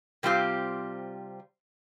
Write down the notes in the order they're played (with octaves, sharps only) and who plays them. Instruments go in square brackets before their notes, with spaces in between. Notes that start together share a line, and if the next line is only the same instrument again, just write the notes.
[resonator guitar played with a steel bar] C3 G3 C4 F4 G4